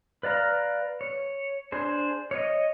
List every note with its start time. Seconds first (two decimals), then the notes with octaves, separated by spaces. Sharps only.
0.23 B4 D5 F5 A#5
1.01 C#5
1.72 D4 G#4 C5
2.31 C#5 D#5